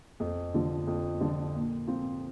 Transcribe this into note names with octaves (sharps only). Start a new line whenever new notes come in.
F2
D3 F3
F2
D3 F3
A#2
F3 C4 F4